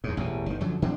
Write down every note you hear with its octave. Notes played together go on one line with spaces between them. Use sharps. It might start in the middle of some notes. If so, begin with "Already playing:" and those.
D#2 G#2
A1 E2 B2
G1 D#3
F#2 D3 F3 F#3
D3 C4 D4